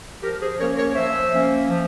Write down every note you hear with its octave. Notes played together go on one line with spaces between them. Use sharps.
F3 G4 A#4
G#4 C5
A#3 C#4 A#4 C#5
A#4 C#5
F3 C5 E5
A#3 C#4
F3